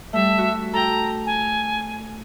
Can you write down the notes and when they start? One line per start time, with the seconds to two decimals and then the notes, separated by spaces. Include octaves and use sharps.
0.13 G3 A3 E5
0.38 F#4
0.73 A4 G5 A#5
1.26 G#5